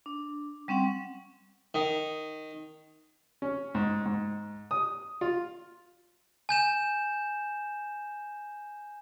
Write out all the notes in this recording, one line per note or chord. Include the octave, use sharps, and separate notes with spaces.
D4
G3 C4 C#4 F#5 C6
D#3
C#4
G#2
G#2
D#6
F4
G#5 G6 E7